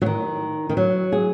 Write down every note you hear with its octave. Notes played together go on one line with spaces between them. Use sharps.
F#3
D#3
D#3
F#3
G#4